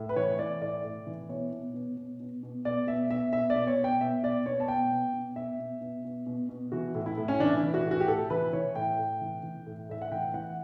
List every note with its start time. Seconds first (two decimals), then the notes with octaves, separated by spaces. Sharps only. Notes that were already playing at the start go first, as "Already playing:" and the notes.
Already playing: A2
0.09 B4
0.16 E3 C#5
0.39 E3 D5
0.61 A2 D5
0.84 A2
1.07 E3
1.29 B2 C#5
1.53 B2
1.74 B2
1.97 B2
2.20 B2
2.43 B2
2.65 B2 D5
2.87 B2 E5
3.10 B2 E5
3.33 B2 E5
3.50 D5
3.56 B2
3.67 C#5
3.78 B2
3.84 G5
4.01 B2 E5
4.23 B2 D5
4.46 B2 C#5
4.60 A5
4.68 B2 G5
4.91 B2
5.14 B2
5.36 B2 E5
5.60 B2
5.81 B2
6.05 B2
6.26 B2
6.49 B2
6.72 E3 F#4
6.95 A2
7.06 E4
7.17 A2
7.28 C#4
7.40 E3 D4
7.57 E4
7.63 E3
7.74 F#4
7.85 A2
7.91 F#4
8.00 G4
8.08 A2 A4
8.30 E3 B4
8.53 E3 C#5
8.75 A2 G5
8.99 A2
9.21 E3
9.43 E3
9.66 A2
9.89 A2 E5
10.02 F#5
10.12 E3 G5
10.34 E3 F#5